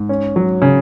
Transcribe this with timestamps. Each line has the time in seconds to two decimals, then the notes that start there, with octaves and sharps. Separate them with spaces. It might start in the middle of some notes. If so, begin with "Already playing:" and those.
Already playing: G#2
0.09 C#4
0.36 F#3
0.62 C#3